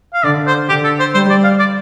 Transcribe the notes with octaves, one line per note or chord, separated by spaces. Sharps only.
F5
D3 D5
C5
D3 G4
A4
C5
G3 C5
D5
F5
D5